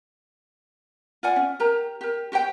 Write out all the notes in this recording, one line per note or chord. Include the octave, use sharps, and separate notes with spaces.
F4 D5 F#5 G#5
C#4
G4 A#4 A#5
G4 A#4
F#4 G4 C5 G5